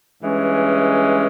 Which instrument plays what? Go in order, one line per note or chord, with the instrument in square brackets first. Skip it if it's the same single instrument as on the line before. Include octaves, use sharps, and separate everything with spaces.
[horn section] G2 E3 G#3 C#4